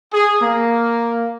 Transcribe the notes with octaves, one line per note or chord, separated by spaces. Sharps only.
G#4
A#3